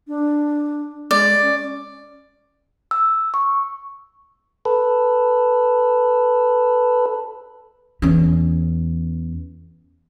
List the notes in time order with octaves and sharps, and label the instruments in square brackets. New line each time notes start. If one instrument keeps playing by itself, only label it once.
[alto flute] D4
[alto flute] G#3 [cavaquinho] D5
[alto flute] C#4
[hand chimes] E6
C#6
[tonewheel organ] A4 B4
[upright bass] E2 C#4